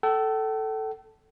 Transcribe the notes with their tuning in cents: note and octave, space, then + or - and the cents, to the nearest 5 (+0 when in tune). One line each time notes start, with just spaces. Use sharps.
A4 +0 G5 -45